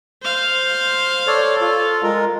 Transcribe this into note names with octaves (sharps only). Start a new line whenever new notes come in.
C5 F5
A4 C#5 D5
F4 A4
G#3 F4 A#4